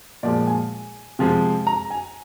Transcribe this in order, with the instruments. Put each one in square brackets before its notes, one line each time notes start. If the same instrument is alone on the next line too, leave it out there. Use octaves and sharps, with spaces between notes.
[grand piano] A#2 F3 G#3 D5
G#5
C3 F3 G#3
A#5
G#5